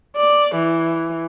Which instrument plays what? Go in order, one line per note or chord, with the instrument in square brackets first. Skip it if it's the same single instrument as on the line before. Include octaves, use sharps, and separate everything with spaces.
[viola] D5
E3